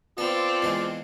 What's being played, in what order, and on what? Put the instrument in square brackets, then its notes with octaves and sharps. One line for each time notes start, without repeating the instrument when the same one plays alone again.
[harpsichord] B3 [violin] C4 A4 [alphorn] F4 [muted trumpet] D5
[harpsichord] E2 G#3